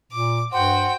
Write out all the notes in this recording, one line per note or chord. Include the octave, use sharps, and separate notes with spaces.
A#2 D6
G2 F#4 C5 F#5 G5